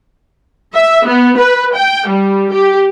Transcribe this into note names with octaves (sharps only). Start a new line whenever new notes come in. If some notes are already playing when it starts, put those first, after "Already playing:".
E5
B3
B4
G5
G3
G4